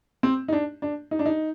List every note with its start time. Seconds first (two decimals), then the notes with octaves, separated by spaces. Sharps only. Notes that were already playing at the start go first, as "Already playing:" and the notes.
0.23 C4
0.48 D#4
0.53 D4
0.82 D4
1.11 D#4
1.19 D4
1.25 D#4